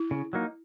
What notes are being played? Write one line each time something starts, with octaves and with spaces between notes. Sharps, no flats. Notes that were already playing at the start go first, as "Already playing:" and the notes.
Already playing: E4
C#3
F#3 A#3 D#4